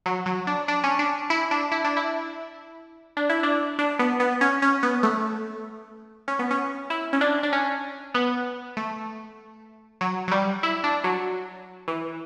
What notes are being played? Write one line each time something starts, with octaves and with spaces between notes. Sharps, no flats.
F#3
F#3
D4
D4
C#4
D4
E4
D4
E4
D4
E4
D4
E4
D4
D4
B3
B3
C#4
C#4
B3
A3
C#4
B3
C#4
E4
C#4
D4
D4
C#4
B3
A3
F#3
F#3
G3
E4
D4
F#3
E3